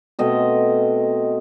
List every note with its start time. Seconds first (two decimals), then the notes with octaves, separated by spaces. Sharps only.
0.19 B2 A3 C4 D#5